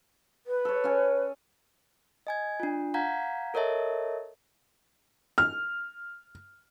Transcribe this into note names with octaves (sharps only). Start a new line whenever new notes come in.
B4
A4 C#5
C#4 G#5
D#5 G#5 G#6
D4 F4
F5 F#5 A#5 G6 G#6 B6
A4 A#4 C#5 D#5 E5 A5
F6